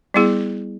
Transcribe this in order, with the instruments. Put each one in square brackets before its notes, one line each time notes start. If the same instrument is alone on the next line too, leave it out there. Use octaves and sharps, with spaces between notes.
[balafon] G3 B3 E4 G#4